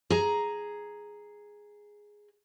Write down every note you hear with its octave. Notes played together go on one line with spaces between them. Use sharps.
G#4 A#5